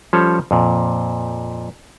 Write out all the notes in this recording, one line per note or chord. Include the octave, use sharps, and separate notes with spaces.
F3 G3 C#4 A4 C5 C#5
F2 A#2